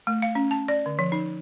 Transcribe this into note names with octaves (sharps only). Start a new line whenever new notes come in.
A3
F5
C#4
A5
D5
D3
F3
D#4